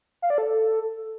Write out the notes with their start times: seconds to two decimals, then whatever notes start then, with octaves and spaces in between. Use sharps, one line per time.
0.22 F5
0.30 D5
0.38 A4